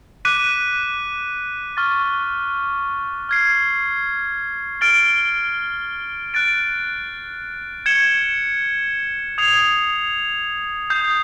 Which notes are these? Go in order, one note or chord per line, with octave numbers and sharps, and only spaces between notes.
D6 F#6 B6 D#7
C#6 F6 A6
F6 G#6 C7
F6 A6 D7 G7
F#6 A6 D7
G#6 C#7 E7 G7
D#6 G#6 C7 F7
D#6 G6 C7